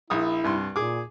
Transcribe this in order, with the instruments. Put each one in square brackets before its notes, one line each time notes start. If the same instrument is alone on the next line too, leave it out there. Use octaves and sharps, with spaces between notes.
[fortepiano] A#1 D#6 [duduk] E4
[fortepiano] C2 G2 C6
[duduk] A#2 [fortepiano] G#4 D6